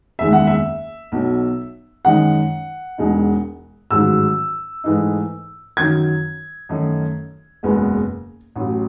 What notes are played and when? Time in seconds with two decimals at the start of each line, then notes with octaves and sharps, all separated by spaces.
0.19 F#1 E2 D#3 G#3 E5
0.33 F#5
0.47 E5
1.12 B1 B2 F#3
2.05 F#2 D#3 G#3 D#4 F#5
2.98 E1 E2 B2 G#3 D#4
3.91 A1 G#2 D#3 F#3 E6
4.84 G#2 E3 A3 D#4
5.77 F#2 D#3 F#3 G#6
6.69 F#2 D#3 A3 D#4
7.63 F#1 E2 B2 G#3 B3
8.56 A1 A2 F#3